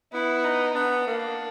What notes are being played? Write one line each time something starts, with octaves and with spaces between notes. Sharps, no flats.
B3 E4
D#4
B3 D4
A#3